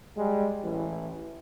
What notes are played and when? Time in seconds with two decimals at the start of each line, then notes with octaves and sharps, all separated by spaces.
0.16 G3 G#3
0.63 A1 E3